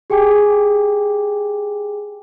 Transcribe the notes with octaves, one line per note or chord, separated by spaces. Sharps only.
G4 G#4 G5 G#5 D6